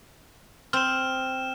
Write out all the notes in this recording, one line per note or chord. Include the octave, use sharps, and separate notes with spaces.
C4 F6 E7